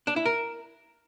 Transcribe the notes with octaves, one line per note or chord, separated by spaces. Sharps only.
D4
E4
A#4